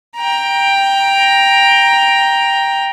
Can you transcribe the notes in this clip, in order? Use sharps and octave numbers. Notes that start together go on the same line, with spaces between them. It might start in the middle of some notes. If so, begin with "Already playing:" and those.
G5 A#5